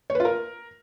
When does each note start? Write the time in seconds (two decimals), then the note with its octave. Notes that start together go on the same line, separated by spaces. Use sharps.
0.10 C#5
0.15 B4
0.20 F4
0.25 A#4